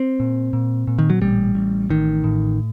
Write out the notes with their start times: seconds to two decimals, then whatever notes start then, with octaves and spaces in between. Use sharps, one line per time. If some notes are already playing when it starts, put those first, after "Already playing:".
Already playing: C4
0.20 A#2
0.53 A#2
0.87 A#2
0.98 D#3
1.10 F#3
1.22 A1 G3
1.55 A1
1.90 A1 D#3
2.24 A2